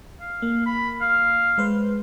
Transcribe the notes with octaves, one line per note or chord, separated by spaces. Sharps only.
F5
A#3
B5
F5
G#3 B4 C5